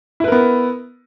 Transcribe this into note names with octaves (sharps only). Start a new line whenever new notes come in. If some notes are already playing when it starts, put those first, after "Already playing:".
B3 E4 A#4 B4